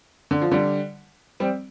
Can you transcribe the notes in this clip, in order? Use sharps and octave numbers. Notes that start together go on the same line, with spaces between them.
D3
F3
D3 G3
G3 C4